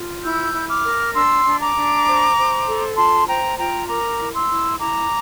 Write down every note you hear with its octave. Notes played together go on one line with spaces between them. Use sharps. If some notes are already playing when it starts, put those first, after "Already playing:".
Already playing: F4
E4 E6 G6
E4
D6 F6
A#4
D4 C6 E6
D4
A#5 D6
D4
C5
C5
A4
F4 A5 C6
C5 G5 A#5
F4 G5 A#5
A#4 A#5 D6
E4
C6 E6
E4
E4 A#5 D6